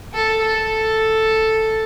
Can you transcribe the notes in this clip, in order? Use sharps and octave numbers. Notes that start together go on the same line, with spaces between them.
A4
A4